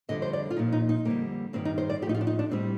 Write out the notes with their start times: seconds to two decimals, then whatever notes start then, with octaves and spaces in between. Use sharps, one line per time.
0.09 F2 D3 G3 D#5
0.22 C5
0.33 D5
0.50 F4
0.56 A#2 F3 D#4
0.72 D#4
0.89 D#4
1.05 F2 D3 G3 A#3
1.53 G2 D#3 G3 C4
1.65 D#4
1.78 C5
1.90 D5
2.02 F3 G4
2.06 A2 D#4
2.14 F4
2.21 D4
2.27 D#4
2.39 D4
2.51 A2 G3 C4